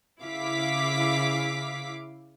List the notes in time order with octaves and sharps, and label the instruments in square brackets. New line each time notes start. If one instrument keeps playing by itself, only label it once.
[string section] C#3 E4 F5 D6 B6